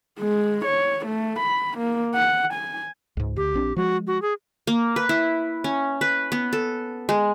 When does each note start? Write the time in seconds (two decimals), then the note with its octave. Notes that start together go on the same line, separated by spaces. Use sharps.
0.19 G#3
0.65 C#5
1.06 A3
1.40 B5
1.78 A#3
2.15 F#5
2.54 G#5
3.17 C#2 G#2
3.36 D2 G4
3.54 A#1 C4 D4
3.77 F3 G#3 F#4
4.07 F#4
4.22 G#4
4.67 A#3
4.96 B4
5.09 E4
5.64 C#4
6.01 B4
6.32 B3
6.53 A4
7.09 G#3